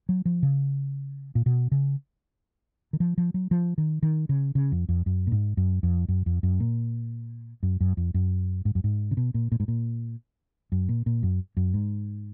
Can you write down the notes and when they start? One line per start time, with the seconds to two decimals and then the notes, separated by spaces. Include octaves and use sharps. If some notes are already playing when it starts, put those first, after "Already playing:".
0.09 F#3
0.25 F3
0.43 C#3
1.35 A#2
1.46 B2
1.72 C#3
2.93 D#3
3.00 F3
3.18 F3
3.34 F#3
3.51 F3
3.78 D#3
4.03 D#3
4.29 C#3
4.55 C#3
4.72 F2
4.89 F2
5.06 F#2
5.27 A#2
5.32 G#2
5.57 F#2
5.83 F2
6.08 F#2
6.26 F2
6.43 F#2
6.60 A#2
7.63 F#2
7.81 F#2
7.97 F2
8.14 F#2
8.65 G#2
8.75 F#2
8.84 G#2
9.11 C#3
9.17 B2
9.34 A#2
9.52 A#2
9.60 G#2
9.68 A#2
10.72 F#2
10.89 A#2
11.06 A#2
11.23 F#2
11.57 F#2
11.74 G#2